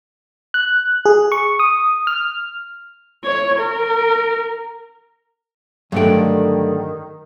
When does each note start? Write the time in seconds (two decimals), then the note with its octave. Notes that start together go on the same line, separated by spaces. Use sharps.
0.54 F#6
1.05 G#4
1.32 C#6
1.59 D#6
2.07 F6
3.24 C#5
3.59 A#4
5.92 G2 D3 D#3 F#3 A3 G5